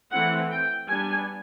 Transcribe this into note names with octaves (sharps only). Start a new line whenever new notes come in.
E3 A3 C4 E4 F#5
G5
G3 B3 D4 G#5